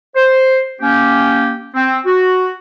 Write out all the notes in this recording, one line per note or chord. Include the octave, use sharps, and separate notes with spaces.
C5
A#3 C#4 G4
C4
F#4